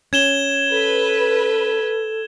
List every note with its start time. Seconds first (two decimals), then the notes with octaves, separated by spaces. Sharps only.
0.13 C#4 G#6 E7 G7
0.71 A4 B4